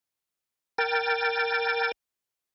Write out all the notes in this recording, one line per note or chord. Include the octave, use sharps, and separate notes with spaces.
A#4 G5 A6